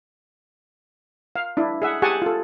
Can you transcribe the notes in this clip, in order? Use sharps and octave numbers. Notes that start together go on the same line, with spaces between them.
F5
D4 E4
G#4 E5 F#5
G4 G#4 F#5 G#5 A5 C#6
F4 A4